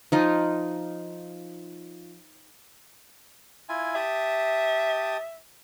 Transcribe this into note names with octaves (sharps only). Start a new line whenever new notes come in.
F3 D#4 F4
E4 F4 G#5
G4 E5 A5 D#6